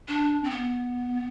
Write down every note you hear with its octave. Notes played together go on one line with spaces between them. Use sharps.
D4
C4
B3